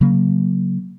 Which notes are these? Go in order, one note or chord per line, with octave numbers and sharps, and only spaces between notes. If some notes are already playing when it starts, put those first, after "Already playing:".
C#3 F#3 A#3